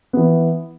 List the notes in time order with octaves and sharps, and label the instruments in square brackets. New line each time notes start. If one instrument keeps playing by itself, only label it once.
[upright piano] E3 B3